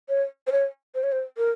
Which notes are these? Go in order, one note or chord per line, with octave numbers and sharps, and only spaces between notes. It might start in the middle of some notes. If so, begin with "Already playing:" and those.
C#5
C5
C#5
C5
C#5
C5
A#4